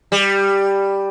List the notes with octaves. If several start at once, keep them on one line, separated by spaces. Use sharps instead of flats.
G3